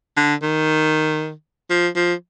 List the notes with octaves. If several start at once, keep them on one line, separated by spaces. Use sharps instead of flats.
D3
D#3
F3
F3